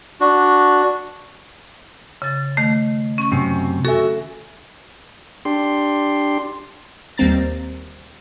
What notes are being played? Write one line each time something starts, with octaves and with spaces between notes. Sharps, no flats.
D4 F#4
C#3 A6
D#3 A3
C#4 C#6
F#2 C3
F#4 A4 E5 G#5
D4 G4 C6
D#2 G3 A#3 C4 A#5 A6